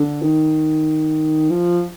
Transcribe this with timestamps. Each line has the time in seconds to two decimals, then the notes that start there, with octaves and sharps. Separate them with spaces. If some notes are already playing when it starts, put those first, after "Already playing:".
Already playing: D3
0.22 D#3
1.50 F3